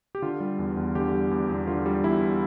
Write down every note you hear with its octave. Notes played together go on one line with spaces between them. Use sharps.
G4
D3 F4
G3
E2
E2
D3 G4
G3
E2
E2
D3 F4
G3
E2 E4